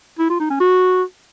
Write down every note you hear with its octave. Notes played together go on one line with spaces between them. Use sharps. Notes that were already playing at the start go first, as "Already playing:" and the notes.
E4
F4
D#4
C#4
F#4